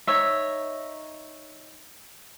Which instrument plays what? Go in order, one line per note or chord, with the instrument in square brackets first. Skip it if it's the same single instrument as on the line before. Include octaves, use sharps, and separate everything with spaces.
[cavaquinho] D#4 C#5 E5